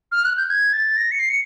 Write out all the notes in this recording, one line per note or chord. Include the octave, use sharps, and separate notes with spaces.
F6
F#6
G6
G#6
A6
A#6
C#7
C7
C#7